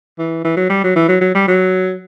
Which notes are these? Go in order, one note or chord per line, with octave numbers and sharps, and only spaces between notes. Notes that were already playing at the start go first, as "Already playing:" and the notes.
E3
E3
F#3
G3
F#3
E3
F#3
F#3
G3
F#3